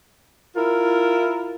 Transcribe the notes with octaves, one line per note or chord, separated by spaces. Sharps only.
E4 F4 A#4